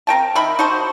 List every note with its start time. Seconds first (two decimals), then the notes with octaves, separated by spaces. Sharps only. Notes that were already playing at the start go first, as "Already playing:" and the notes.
0.07 C4 A#4 G5 A5
0.35 D#3 E5 B5
0.59 D#4 F#4 C5 A5